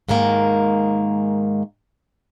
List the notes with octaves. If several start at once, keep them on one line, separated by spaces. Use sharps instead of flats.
G#2 D#3 G#3 A#3